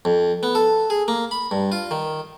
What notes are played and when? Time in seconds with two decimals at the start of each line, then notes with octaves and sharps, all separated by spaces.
0.05 F2
0.43 B3
0.55 A4
0.90 G#4
1.08 A#3
1.31 B5
1.51 G2
1.72 F4
1.91 D#3